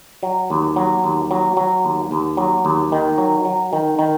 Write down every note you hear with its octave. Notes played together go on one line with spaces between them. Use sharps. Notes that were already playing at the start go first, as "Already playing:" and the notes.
F#3
D#2
F#3
D#2
F#3
F#3
D#2
D#2
F#3
D#2
D#3
F#3
F#3
D#3
D#3